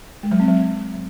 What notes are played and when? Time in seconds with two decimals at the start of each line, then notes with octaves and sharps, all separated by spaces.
0.23 G#3
0.31 F#3
0.40 C4
0.48 F#3